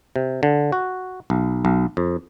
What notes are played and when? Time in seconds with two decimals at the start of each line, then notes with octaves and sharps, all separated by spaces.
0.16 C3
0.43 D3
0.72 F#4
1.30 B1
1.65 B1
1.97 F2